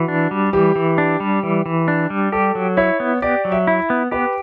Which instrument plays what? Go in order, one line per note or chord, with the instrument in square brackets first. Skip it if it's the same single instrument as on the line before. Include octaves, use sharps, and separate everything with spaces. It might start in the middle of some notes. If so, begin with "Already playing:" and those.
Already playing: [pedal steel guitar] E3 [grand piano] F#4
[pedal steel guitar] D4
G3
[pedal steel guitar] E3 [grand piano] G4
[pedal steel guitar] E3
D4
G3
E3
E3
D4
G3
[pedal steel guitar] G4 [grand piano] A4
[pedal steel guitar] F#3
[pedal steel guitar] E4 [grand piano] C#5
[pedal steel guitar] B3
[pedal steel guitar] G4 [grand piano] D5
[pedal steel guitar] F#3
[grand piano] E5
[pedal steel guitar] E4
B3
[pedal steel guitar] G4 [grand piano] B4